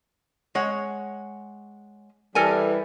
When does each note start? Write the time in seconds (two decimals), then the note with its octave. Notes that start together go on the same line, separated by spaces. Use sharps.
0.55 G#3 C#5 F#5
2.35 E3 G3 A4 A#4 G#5